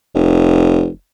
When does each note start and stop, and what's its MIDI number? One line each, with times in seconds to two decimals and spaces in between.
0.14 0.89 29